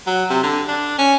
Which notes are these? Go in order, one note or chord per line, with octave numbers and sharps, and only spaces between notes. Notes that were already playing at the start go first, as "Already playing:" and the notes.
F#3
C3
D3
D4
C#4